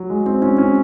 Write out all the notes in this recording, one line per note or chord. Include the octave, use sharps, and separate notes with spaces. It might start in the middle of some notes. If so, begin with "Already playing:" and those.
Already playing: F#3
G#3
C4
C#4
C#4